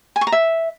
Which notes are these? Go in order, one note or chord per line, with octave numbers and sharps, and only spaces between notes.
G#5
C#6
A#5
E5